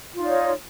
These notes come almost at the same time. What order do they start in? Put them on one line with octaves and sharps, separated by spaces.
F4 D#4 D5 C#5